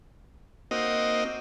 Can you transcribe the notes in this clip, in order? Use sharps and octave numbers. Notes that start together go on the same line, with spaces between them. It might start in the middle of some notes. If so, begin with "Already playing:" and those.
A#3 C4 D#4 F#4 D#5